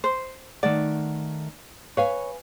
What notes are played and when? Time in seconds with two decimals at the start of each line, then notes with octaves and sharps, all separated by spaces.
0.04 C5
0.63 D#3 A3 D5 F#5
1.97 B4 C#5 F5 G#5